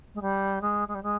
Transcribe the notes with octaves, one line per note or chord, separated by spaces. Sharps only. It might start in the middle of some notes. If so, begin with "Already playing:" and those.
G#3
G3
G#3
G#3
G3
G#3